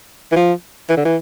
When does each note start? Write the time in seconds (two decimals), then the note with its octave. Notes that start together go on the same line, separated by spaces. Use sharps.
0.32 E3
0.36 F3
0.89 E3
0.97 D3
1.05 E3